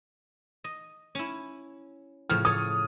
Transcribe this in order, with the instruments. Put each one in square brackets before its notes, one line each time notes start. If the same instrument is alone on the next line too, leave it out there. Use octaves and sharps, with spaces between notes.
[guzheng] D#5
C#4 E4
[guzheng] A2 C#3 F3 [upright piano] F6
[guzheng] A4 C#5 [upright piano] D#6